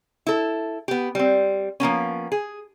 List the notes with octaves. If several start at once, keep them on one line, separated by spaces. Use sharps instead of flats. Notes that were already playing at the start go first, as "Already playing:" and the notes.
E4 A4
B3 G4
G3 C4
F3 A#3 B3 C#4
G#4